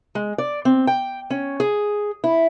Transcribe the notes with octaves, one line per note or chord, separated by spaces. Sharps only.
G#3
D5
C4
G5
C#4
G#4
E4